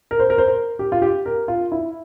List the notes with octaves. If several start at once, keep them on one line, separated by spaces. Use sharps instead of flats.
A#4
C5
A#4
C5
A#4
G4
F4
G4
A#4
F4
E4